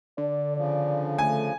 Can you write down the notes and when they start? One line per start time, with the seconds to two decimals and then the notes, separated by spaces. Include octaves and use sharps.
0.18 D3 D5
0.57 C#3 F3 D5
1.18 A3 G#5